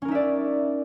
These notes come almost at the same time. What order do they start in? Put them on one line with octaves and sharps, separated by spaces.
C#4 A#4 D#4 E5 D5